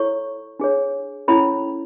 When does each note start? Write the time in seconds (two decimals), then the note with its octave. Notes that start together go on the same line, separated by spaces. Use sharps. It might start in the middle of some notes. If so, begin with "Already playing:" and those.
Already playing: E4 A4 C#5 C#6
0.60 D4 G#4 C#5
1.28 C#4 E4 A4 C#5 B5